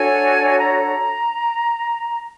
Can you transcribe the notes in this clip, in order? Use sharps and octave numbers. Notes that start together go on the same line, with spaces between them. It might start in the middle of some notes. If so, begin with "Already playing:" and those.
Already playing: D4 F#4 A4 C#5 G#5
A#5